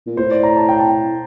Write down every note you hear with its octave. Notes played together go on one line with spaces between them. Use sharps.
A#2
A2 C5
D5
A#5
A5
G5
A5
G5